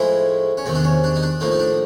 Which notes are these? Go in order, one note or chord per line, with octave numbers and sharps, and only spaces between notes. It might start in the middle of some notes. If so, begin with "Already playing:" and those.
Already playing: A2 F3 G#3 E4
C#4
E2 C3 D#3 C4
D4
C#4
D4
D#4
D4
A2 F3 A#3 D#4
D#4
D4